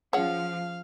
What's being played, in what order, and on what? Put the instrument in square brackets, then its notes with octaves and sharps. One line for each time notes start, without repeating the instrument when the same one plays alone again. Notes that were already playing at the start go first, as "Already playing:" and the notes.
[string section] F3 [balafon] C#4 G#4 [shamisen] C#5 F#5 [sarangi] F5